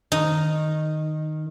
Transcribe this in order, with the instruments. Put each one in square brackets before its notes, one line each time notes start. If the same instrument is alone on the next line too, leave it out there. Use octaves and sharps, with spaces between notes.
[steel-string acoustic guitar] D#3 [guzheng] D#4